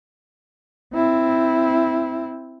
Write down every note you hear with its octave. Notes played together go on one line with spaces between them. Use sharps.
C4 E4